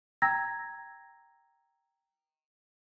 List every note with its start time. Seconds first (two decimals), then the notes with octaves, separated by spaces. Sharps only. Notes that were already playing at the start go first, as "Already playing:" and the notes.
0.22 G5 A#5 E6 G#6 A#6